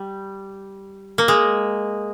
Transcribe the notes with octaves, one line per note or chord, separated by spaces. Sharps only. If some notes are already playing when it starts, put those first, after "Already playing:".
Already playing: G3
A#3
G#3